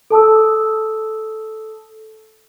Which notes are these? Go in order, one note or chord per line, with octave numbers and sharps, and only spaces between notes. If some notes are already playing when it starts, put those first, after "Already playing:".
A4 A5 D#6 E6